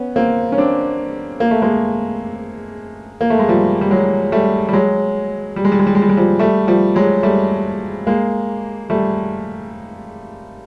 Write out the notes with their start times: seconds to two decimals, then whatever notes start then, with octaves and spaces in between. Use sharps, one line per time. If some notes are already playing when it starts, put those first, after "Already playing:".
Already playing: B3 C#4
0.16 A#3 C4
0.52 C#4
0.58 C4 D4
1.40 A#3
1.51 A3
1.62 G#3 A#3
3.21 A#3
3.30 A3
3.39 G#3
3.48 F3 G3
3.81 G3
3.91 F#3 G#3
4.32 G3 A3
4.69 G3
4.73 F#3 G#3
5.56 G3
5.65 G#3
5.72 G3
5.79 G#3
5.87 G3
5.95 G#3
6.02 G3
6.09 G#3
6.17 F3 G3
6.39 G3 A3
6.67 F3 G3
6.95 F#3 G#3
7.23 G3 A3
8.07 G#3 A#3
8.90 G3 A3